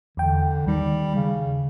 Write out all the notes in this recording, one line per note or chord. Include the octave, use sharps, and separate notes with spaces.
E2 D3 G5
D#2 D#3 G3
C#3